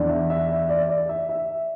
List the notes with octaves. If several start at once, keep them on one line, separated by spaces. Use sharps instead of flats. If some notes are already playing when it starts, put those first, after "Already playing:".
Already playing: E2 E3 D4
E5
E5
E5
D5
D5
E5
E5